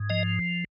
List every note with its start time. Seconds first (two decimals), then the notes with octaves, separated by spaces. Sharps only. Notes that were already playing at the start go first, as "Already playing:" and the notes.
Already playing: G#2
0.10 F3 D#5